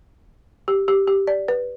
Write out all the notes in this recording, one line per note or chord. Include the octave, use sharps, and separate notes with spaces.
G4
G4
G4
D5
B4